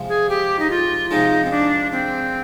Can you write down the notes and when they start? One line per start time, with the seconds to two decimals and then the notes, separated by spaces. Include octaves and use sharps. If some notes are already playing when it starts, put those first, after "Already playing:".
Already playing: C3 F3 G#3
0.09 G#4
0.29 G4
0.59 D#4
0.70 F4
1.10 C3 F3 G#3 D#4
1.45 C4
1.51 D4
1.92 C4